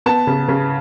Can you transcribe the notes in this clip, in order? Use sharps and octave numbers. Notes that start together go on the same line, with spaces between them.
B3 A5
C#3
C#3